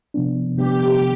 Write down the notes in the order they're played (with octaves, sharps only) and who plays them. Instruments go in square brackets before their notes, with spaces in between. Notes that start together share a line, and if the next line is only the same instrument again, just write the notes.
[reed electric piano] C3 F3 B3 D4
[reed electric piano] C3 F3 B3 D4 [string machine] G4